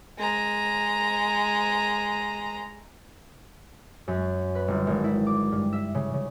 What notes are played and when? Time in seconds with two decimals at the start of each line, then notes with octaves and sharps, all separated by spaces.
0.19 G#3 A#5
4.08 F#2
4.55 B4
4.68 G1
4.87 G#1
5.04 E4
5.27 D6
5.52 G2
5.73 E5
5.95 C#3
6.14 C#3